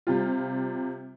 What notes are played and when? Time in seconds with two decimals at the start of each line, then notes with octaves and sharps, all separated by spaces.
0.07 C3 G3 F4